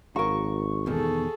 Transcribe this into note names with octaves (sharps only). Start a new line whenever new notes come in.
G#1 F#4 A#4 C#6
E2 B2 D#3 G#4 A4